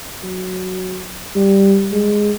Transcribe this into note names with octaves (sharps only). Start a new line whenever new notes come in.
F#3
G3
G#3